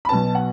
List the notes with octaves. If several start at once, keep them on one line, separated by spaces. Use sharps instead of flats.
B5
B1 B2 B3 A5
F#5